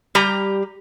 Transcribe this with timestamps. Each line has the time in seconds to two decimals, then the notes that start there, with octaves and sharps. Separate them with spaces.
0.15 G3 G4 A#5